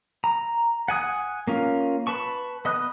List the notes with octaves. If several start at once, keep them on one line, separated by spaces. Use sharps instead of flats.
A#5
F#5 G#5 D#6 F#6
A#3 C#4 F4
B4 A5 C#6
B3 D#5 D#6 F#6